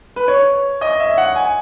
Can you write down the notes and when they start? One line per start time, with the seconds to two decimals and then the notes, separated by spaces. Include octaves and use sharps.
0.16 B4
0.28 C#5
0.81 D#5
1.00 E5
1.18 F#5
1.36 G#5